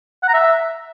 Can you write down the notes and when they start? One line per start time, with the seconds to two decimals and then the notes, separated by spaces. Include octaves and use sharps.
0.23 F#5
0.28 A#5
0.34 E5